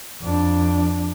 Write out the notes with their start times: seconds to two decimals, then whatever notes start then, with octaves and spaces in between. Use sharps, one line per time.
0.22 F2 D4